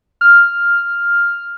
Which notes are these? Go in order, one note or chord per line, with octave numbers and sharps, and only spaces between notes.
F6